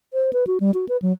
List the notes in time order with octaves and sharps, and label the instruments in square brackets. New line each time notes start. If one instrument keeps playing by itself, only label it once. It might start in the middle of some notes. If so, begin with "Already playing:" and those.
[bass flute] C5
B4
F#4
G3
F#4
B4
F#3